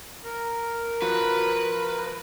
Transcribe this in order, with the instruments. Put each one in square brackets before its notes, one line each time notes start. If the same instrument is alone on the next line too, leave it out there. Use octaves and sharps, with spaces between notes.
[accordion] A#4
[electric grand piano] F3 [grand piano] F#4 [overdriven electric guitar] B4